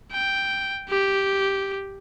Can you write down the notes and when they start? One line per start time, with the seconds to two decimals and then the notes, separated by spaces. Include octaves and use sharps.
0.12 G5
0.89 G4